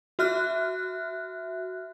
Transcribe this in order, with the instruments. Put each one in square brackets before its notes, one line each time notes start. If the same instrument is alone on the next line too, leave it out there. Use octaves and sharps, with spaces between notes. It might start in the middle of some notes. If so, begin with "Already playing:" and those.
[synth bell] F#4 E5 F6 F#6